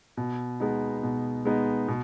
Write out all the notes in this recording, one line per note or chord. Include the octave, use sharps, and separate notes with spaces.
B2
G#3 B3 D#4
B2
G#3 B3 D#4
B2